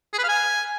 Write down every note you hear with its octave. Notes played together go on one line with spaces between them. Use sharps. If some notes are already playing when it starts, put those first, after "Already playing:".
G#4
B4
F5
G#5